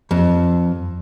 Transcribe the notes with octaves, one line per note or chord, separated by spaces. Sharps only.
F2